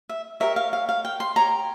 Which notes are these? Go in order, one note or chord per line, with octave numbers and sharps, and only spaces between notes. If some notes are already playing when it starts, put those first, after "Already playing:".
E5
G4 A#4 C#5 E5
F5
F5
F5
G5
C6
G4 C#5 A#5